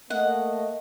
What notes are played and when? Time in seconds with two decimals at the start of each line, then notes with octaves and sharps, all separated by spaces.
0.10 A3 A#3 D#5 F#5